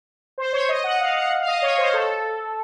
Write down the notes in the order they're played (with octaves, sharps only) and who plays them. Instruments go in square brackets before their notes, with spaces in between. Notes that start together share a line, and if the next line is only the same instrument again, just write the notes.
[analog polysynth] C5
C#5
D#5
F#5
F5
F#5
F5
D#5
C#5
C5
A4